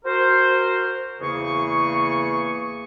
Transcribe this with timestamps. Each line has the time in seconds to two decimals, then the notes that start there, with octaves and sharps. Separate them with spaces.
0.04 F#4 A#4 C5
1.20 E2 C#3 A#3 G#4 C#6